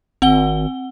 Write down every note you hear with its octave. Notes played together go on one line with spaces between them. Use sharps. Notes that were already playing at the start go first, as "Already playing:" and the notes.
G#1 C4 F#5 G7